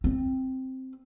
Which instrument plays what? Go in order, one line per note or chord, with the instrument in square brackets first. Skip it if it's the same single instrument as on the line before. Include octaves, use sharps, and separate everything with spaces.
[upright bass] C4